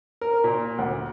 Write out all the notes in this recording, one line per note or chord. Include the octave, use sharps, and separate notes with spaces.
A#4
A#2
D2